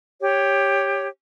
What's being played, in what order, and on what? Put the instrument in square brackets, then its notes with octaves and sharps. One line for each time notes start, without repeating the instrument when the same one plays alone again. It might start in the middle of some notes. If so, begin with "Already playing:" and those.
[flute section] G4 C#5